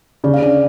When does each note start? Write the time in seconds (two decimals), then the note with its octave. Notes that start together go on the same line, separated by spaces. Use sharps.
0.24 C#3 D5
0.34 F5
0.42 D4 D5